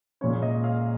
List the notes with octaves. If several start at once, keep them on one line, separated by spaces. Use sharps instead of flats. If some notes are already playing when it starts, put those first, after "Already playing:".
A#2 G#3 C#4 C#5
D#5
F5